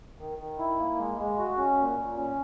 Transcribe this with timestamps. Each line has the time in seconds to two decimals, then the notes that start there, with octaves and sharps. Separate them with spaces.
0.19 D#3
0.38 D#3
0.59 E4
0.78 A#3
0.98 G#3
1.18 G#3
1.38 F#4
1.57 C#4
1.77 A#2
1.98 A#2
2.17 C#4